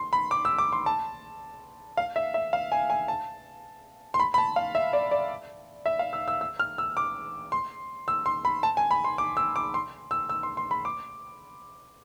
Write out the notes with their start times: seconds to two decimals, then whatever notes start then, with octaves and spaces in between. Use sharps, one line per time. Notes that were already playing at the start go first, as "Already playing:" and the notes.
Already playing: C6
0.13 B5
0.31 D6
0.45 E6
0.58 D6
0.73 C6
0.86 A5
1.97 F5
2.16 E5
2.34 E5
2.53 F5
2.72 G#5
2.90 G#5
3.08 A5
4.14 C6
4.20 B5
4.34 B5
4.38 A5
4.56 F5
4.75 E5
4.93 D5
5.11 D5
5.86 E5
5.99 F5
6.13 E6
6.28 E6
6.41 E6
6.59 F6
6.78 E6
6.97 D6
7.52 C6
8.08 E6
8.26 C6
8.45 B5
8.63 A5
8.77 G#5
8.91 B5
9.04 C6
9.18 D6
9.37 E6
9.56 D6
9.74 C6
10.11 E6
10.29 E6
10.43 C6
10.57 C6
10.71 B5
10.85 D6